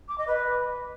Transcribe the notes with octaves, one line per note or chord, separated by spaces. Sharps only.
D6
D#5
B4